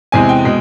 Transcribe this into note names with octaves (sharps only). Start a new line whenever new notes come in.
E2 C3 E3 G#3 G#5
G5
B2 G#3